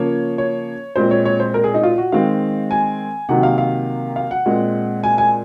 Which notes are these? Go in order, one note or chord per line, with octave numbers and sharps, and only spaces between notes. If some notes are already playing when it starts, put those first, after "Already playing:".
Already playing: C#3 F3 A#3 C#5
C#5
A#2 G#3 C4 C5
C#5
C#5
C5
A#4
G#4
D#4
F4
F#4
D#3 G#3 C4 F5
G#5
C3 D#3 F#3 A#3 F#5
F5
F5
F5
F#5
A#2 G#3 C4
G#5
G#5